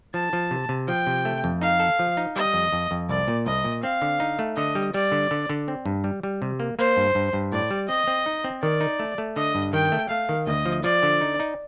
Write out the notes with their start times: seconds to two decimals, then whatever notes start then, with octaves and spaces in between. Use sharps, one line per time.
0.14 F3 A5
0.33 F3
0.51 C3
0.69 C3
0.88 F3 G5
1.07 C3
1.25 A3
1.44 F2
1.61 D#4 F5
1.80 A4
1.99 F3
2.17 D#4
2.36 G3 D#5
2.54 F2
2.72 F2
2.91 F2
3.09 C2 D5
3.28 A#2
3.46 C2 D#5
3.64 A#2
3.83 C4 F5
4.02 D3
4.20 D#4
4.39 A3
4.57 D3 D#5
4.75 G3
4.94 G3 D5
5.12 D3
5.31 D3
5.49 D3
5.68 C4
5.86 G2
6.04 G3
6.23 G3
6.42 C3
6.60 A#3
6.79 A#3 C5
6.97 G2
7.15 G2
7.33 G2
7.52 A2 D5
7.71 G3
7.89 C4 D#5
8.07 C4
8.26 D#4
8.44 C4
8.62 D#3 D5
8.81 D#4
8.99 A3
9.18 A3
9.36 D3 D#5
9.55 G2
9.73 D#3 G5
9.92 A3
10.10 A3 F5
10.29 D#3
10.47 D2 D#5
10.66 F3
10.84 F3 D5
11.03 D3
11.21 D#4
11.40 D#4